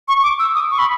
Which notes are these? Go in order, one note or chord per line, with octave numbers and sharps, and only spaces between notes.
C#6
D6
E6
D#6
C#6
B5